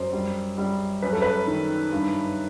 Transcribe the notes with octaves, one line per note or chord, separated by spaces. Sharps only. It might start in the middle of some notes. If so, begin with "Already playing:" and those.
Already playing: F#2 C5
G3
G3
F#2 B4
A4
B4
D#3
G2